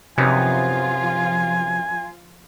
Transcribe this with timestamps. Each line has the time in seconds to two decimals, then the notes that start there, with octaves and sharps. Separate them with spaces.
0.18 F#2 C3 F3 B3 D#4 F4 G#5